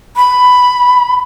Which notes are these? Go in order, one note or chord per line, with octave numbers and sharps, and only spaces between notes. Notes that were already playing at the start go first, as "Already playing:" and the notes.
B5